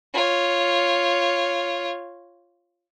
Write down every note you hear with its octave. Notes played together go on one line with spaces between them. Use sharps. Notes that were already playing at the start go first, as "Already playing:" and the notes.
F4 C#5